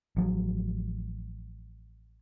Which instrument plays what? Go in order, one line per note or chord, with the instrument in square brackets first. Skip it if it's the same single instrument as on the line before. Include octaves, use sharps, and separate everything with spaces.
[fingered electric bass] A1 F3 F#3